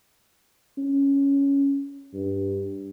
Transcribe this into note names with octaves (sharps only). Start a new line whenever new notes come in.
C#4
G2